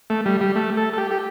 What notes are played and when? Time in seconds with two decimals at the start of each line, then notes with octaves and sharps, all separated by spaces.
0.10 A3
0.26 G3
0.41 G3
0.56 A3
0.77 A4
0.93 A4
0.98 G4
1.11 G4